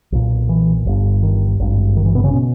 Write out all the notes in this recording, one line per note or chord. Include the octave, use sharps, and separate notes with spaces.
B1 A#2
E3
G1 G2
D#3
G#1 G2
D#3
E3
B2 B3
C#3 C#4
B2